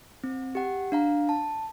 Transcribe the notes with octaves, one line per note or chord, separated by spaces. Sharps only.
C4
G4 F#5
D4 F5 A#5
A5